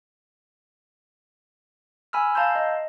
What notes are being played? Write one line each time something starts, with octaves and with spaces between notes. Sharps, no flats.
G#5 B5 E6 F6
F5 A5 A#5 C6 E6 G6
D#5